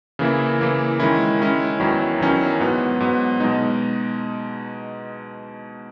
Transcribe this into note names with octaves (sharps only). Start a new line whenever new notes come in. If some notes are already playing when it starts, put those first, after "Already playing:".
C#3 E3 A#3 E4
C#3 E3 A#3 E4
D#3 G#3 C#4 E4
D#3 G#3 C#4 E4
E2 D#3 F#3 C#4 E4
E2 D#3 F#3 C#4 E4
G#2 F#3 B3
G#2 F#3 B3
B2 G#3 D#4